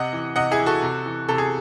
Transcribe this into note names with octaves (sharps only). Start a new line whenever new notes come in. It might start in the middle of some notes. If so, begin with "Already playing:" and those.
Already playing: C3 D#5 F#5
E3
C3 D#5 F#5
E4 G#4
E3
F#4 A4
C3
E3
C3 A4
G#4